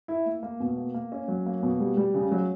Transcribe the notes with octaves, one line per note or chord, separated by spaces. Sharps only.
E4
A#3
A#3
B2
A#3
A#3
C#4
F#3
A#3
B2
G3
G3
C#3
F#3